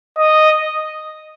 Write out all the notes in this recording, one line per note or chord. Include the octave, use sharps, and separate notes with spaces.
D#5